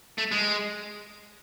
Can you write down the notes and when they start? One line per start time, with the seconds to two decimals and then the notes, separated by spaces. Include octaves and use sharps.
0.18 A3
0.31 G#3